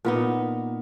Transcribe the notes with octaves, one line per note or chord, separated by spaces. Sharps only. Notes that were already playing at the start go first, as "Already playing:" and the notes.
A#2 B3 D#4